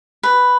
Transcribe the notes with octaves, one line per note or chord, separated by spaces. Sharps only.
B4